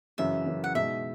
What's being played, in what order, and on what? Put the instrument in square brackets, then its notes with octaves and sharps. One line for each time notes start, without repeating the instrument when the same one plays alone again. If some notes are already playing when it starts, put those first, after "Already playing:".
[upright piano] F#2 C#3 E3 [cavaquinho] E5
[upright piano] F#2 C#3 E3
[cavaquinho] F#5
[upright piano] B2 G#3 D#4 [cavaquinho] E5